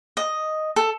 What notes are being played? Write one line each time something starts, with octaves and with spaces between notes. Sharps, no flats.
D#5
A4